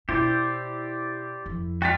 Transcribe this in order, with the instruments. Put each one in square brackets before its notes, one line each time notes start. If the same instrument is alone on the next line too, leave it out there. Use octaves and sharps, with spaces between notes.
[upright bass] B2 [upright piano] E4 [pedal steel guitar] G4 C5 D5
[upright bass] F2
[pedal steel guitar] F4 F#4 [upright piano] G5 A6 B6